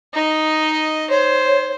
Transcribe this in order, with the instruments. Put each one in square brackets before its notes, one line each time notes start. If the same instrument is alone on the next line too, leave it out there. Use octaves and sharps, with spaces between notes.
[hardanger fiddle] D#4 D#5
[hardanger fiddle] C5 [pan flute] C#5